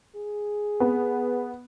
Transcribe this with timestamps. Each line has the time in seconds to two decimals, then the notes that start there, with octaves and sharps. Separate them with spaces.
0.16 G#4
0.80 B3